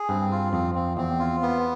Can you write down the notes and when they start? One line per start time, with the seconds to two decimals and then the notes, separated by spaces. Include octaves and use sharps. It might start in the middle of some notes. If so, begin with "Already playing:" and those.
Already playing: G#4
0.09 G2 C4
0.32 F4
0.53 F2 C4
0.75 C4
0.97 E2 C4
1.19 F4
1.42 B3